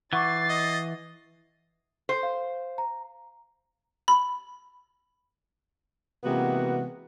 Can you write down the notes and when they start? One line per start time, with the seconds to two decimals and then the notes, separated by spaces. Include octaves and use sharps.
0.13 E3 F#5 C#6 D6 A6 C7
0.50 D#5
2.09 C5
2.23 F5
2.78 A#5
4.08 B5
6.24 C3 E3 G#3 A#3 B3 F#4